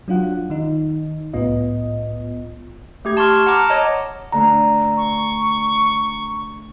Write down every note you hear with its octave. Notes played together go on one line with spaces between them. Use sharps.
F#3 D4 F4 F#5
D#3 D#4
C2 A2 B3 F4 D#5
A3 G4 G#6
A5 C6 C#6 F6
F#5 A5 A#5 D6 F6
C#5 D#5 A#5
D3 A3 D4 A#5
C#6